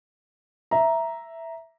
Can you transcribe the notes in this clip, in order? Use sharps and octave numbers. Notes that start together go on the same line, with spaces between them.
E5 A#5